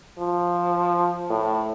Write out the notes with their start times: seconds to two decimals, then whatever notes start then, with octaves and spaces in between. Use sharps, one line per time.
0.19 F3
1.30 A2